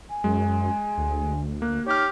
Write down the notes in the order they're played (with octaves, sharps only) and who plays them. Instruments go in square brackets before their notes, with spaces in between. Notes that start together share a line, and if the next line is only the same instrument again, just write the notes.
[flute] G#5
[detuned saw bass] F#2 [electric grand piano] G#3
[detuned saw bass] D2
[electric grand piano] A#3 [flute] F#6
[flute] D#4 [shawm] G4 [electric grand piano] C#5 F6